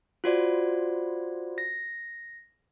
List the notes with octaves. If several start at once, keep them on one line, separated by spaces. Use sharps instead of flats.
F4 F#4 C5 D5
A#6